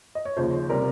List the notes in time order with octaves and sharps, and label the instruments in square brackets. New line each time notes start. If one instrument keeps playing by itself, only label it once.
[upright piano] D#5
C#5
D#2 C#3 F3 C5
C3 G3 A#4